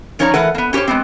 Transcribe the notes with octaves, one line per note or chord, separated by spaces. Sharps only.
F3 C#4 D#4 C#5 D5 A#5
E3 A3 A#4 B4 F#5
A#3 B3
C#4 G4 A#4 C5 C#5
G#3 B3 C4